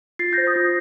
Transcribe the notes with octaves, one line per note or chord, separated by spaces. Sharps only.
F4 A6 C7
C5 G6 A#6
D#6 G6
F4